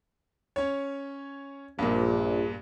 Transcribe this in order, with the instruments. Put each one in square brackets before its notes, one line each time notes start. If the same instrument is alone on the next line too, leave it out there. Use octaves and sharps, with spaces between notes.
[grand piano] C#4 C#5
[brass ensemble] A#1 [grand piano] G2 A#2